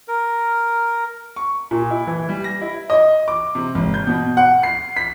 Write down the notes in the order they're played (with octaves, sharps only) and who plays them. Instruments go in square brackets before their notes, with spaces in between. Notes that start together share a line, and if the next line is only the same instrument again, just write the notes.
[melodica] A#4
[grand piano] C#6
A#2
E4
E3
G3
A#6
E4
D#5
D6
C3
G#1
G6
B2
F#5
C7
B6